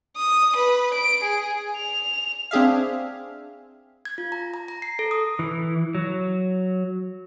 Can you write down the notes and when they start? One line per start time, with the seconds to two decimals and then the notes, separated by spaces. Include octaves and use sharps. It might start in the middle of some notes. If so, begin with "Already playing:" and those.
0.17 D#6
0.56 B4
0.94 D7
1.23 G#4
1.77 F7
2.51 C4 D4 G#4 E5 F5
4.05 G#6
4.18 F4
4.32 A#5
4.54 A#5
4.68 A#5
4.82 C7
4.99 A4
5.11 D#6
5.39 E3
5.95 F#3